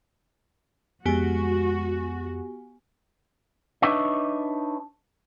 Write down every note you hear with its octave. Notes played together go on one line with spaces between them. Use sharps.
F2 G#3 B3 F#4 G4 G#5
D4 D#4 B4 C#5 D#5 E5